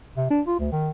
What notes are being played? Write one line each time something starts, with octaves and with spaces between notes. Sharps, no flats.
C3
D4
F4
D2
D#3